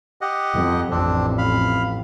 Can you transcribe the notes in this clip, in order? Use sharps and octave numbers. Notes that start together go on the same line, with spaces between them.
G4 D#5 F#5
F2
A1 F2 A2 C4 D4
F5 B5